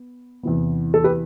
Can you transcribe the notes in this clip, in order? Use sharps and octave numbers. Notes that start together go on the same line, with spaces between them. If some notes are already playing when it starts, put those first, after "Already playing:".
Already playing: B3
E2 C3 E3 B3
A4
G4 B4